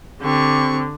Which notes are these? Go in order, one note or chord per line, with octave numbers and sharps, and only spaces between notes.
D3 C4 G4 C#6